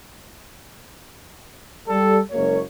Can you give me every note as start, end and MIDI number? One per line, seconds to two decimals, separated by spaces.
1.89 2.18 55
1.89 2.18 69
2.32 2.59 30
2.32 2.59 56
2.32 2.59 58
2.32 2.59 66
2.32 2.59 73